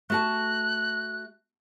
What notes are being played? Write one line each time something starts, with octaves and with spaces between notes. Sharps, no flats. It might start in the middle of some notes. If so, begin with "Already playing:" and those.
A3 F#4 A5 F#6